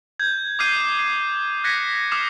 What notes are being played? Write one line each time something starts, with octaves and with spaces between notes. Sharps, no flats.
G6 G#6
D6 D#6 F6 G6 C7 D#7
C7
F#6 G#6 A#6 B6 C#7
D6 D#6 F6 C7 E7